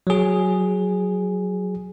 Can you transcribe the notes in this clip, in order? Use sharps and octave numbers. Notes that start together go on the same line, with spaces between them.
F#3 G#4